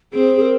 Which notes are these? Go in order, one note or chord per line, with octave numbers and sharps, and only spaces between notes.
C4 G#4
G#4
A#4